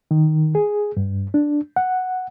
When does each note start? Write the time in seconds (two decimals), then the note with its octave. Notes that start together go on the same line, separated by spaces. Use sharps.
0.11 D#3
0.55 G#4
0.97 G2
1.34 D4
1.76 F#5